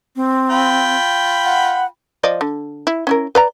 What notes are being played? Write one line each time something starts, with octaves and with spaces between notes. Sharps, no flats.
C4
F4 G5 B5
F#5
F3 D5 D#5
D3
E4
C#4 E4 A#4
B4 D5 A#5